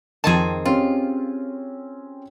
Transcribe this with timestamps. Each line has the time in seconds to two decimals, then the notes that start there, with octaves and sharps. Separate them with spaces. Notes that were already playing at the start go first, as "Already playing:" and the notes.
0.24 F2 D#3 C4 G#4 A5
0.65 C4 C#4 F4 G4